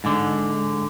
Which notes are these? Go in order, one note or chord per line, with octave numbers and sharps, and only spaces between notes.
G#2 D3